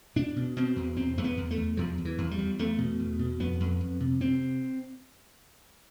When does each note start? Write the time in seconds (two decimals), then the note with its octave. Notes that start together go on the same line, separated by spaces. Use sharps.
0.16 B2 D4
0.36 B2
0.56 B2 C4
0.76 E2
0.97 E2 C4
1.18 E2 A3
1.24 B3
1.37 E2
1.51 A3
1.57 E2
1.77 E2 F3
1.98 E2
2.05 E3
2.18 E2
2.31 G3
2.39 E2
2.59 E2 A3
2.78 B2
3.00 E2
3.19 B2
3.40 F2 B3
3.60 F2
3.81 F2
4.00 C3
4.20 C3 C4